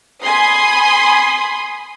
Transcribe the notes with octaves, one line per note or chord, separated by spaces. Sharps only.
G#5 B5 C6 D#6